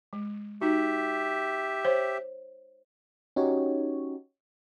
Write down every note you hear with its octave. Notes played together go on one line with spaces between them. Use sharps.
G#3
D#4 F#4 G4 E5
C5 C#5
C#4 D#4 F#4 G4 C#5